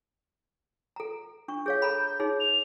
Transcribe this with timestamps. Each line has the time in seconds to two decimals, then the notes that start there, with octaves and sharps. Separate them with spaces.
0.96 A4 A#5
1.48 D4 C#6
1.66 G#4 C#5 F5 G6
1.82 A4 A#5 B5
2.20 D#4 G#4 C#5
2.40 F7